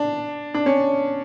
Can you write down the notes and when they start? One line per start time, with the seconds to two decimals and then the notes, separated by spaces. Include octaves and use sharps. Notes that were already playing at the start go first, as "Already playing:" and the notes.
Already playing: D4
0.54 D4
0.66 C#4